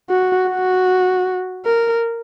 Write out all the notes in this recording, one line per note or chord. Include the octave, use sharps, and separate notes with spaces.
F#4
F#4
A#4